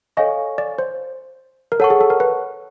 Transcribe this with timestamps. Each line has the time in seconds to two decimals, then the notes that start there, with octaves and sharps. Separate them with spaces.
0.17 A4 C#5 D#5 F5 G#5 C#6
0.58 D5
0.79 C5
1.72 A#4
1.80 A4 C#5 F#5 A5 C#6
1.90 G#4
2.01 A4
2.10 A#4
2.20 B4